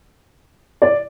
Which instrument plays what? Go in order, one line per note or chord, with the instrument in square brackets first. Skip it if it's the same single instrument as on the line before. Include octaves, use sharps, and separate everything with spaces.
[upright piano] D5